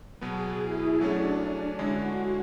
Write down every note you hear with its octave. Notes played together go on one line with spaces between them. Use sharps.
B2 F#3 B3 G#4
E4
F#3 A3 C#4 D4
D4
D3 G#3 C#4 E4 F#4